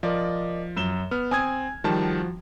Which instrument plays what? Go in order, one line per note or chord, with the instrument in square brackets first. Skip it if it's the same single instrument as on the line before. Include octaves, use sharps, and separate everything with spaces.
[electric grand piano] F3 [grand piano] A#4 D5 D#5
[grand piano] F#2 E7 G7
[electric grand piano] B3 [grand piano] F6
[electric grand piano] C4 D#6 G#6 [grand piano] G#5
[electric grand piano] D#3 G3 A5 [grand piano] F3 F#4